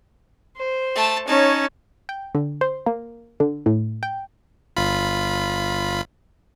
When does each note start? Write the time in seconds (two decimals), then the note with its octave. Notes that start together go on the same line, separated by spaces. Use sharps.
0.57 C5
0.95 A3 A5
1.27 C#4 D#4 C#5 A5
2.09 G5
2.35 D3
2.61 C5
2.86 A#3
3.40 D3
3.66 A2
4.03 G5
4.77 G1 F4 B5